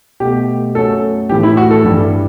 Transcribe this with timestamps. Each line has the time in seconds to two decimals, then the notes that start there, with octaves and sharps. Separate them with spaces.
0.20 B2 A3 G4
0.75 F#2 F#3 A3 A4
1.29 A2 E3 A3 G4
1.43 E4
1.57 F#4
1.71 A4
1.84 G2 E3 G3